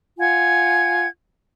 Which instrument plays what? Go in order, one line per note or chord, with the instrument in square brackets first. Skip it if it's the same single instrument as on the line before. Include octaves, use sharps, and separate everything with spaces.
[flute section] F4 F#5 G#5 G#6